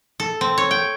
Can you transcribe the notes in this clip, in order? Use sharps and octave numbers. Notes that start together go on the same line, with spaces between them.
A4
C4
C#5
G5